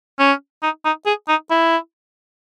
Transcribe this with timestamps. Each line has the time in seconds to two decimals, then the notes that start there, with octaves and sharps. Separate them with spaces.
0.19 C#4
0.63 D#4
0.85 D#4
1.06 G#4
1.28 D#4
1.50 E4